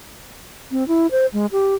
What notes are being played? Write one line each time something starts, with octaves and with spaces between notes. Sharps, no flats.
C4
E4
C5
G#3
G4